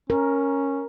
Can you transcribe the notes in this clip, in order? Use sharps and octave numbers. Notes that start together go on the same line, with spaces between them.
C#4 A#4